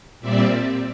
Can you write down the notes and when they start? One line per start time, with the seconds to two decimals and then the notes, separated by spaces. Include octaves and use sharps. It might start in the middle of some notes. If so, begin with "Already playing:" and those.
0.20 A#2 G3 C4 D5 E5